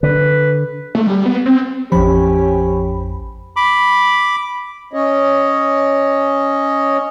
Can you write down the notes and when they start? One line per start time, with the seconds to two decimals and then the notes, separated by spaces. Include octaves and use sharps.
0.03 D3 B4
0.95 A3
1.07 G3
1.26 B3
1.46 C4
1.92 A1 F2 F3 C#4 G4 B5
3.56 B5 D6
4.93 C#4 C#5 D#5